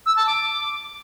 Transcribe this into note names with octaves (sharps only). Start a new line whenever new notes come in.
E6
A5
D6